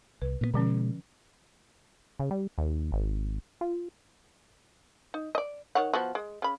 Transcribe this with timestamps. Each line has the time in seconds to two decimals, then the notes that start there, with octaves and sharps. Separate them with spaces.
0.22 C2 B4
0.41 A#2 D3 B3
0.54 B2 D3 F3 G#3 C#4
2.19 C#3
2.31 G3
2.58 D#2
2.92 G#1
3.61 F4
5.14 D#4
5.35 D5 D#5
5.75 D#3 C#5 F#5
5.93 F3 B3 F#4
6.15 G#3
6.42 C#3 B5